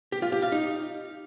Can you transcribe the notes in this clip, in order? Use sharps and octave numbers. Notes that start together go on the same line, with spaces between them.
G4
F4
G4
F5
D#4